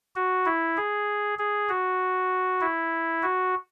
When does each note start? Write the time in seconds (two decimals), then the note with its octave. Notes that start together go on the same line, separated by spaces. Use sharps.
0.16 F#4
0.46 E4
0.77 G#4
1.39 G#4
1.69 F#4
2.61 E4
3.23 F#4